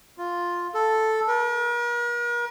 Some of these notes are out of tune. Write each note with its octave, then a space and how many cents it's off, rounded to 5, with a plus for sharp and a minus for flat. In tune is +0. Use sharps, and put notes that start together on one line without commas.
F4 +5
A4 +0
A#4 +45